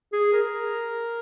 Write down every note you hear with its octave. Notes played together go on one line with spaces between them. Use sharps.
G#4
A#4